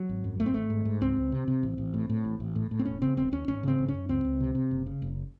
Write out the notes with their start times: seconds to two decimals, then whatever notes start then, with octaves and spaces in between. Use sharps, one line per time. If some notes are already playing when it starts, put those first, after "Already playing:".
Already playing: F#3
0.09 G#1
0.24 F#2
0.40 G#1 A3
0.46 C4
0.54 G#1 A3
0.70 G#2
0.85 G#2
1.01 C#2 C4
1.16 C#2
1.32 C3
1.48 C3
1.63 A1
1.78 A1
1.94 A2
2.09 A2
2.24 A1
2.40 A1
2.55 A2
2.71 A2
2.79 C4
2.85 E1 C#4
3.02 C#3 C4
3.17 E1 C4
3.32 D#2 C#4
3.48 G#1 C#4
3.63 C#3 C4
3.78 G#1
3.88 C#4
3.94 F#2
4.09 C#2 C4
4.25 C#2
4.40 C3
4.55 C3
4.71 F#1
4.86 C#3
5.02 F#1